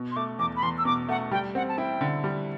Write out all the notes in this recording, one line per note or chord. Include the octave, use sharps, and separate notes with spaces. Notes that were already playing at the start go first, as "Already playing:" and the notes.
Already playing: B2
C6
A3 D6
E2 D6
B5
E2 C6
E6
B2 D6
A3 F#5
G3 G5
C4 F#5
A5
E4 G5
D3
G3